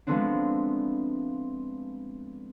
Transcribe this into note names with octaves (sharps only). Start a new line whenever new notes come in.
F3 G#3 A3 B3 C4 D4